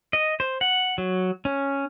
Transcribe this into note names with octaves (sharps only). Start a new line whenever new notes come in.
D#5
C5
F#5
F#3
C#4